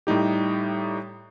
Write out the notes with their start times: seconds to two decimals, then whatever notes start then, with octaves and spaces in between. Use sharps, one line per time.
0.07 A2 G3 D#4 G4